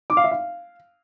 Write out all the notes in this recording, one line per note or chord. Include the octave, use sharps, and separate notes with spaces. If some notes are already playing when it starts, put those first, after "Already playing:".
D6
F5
E5
F5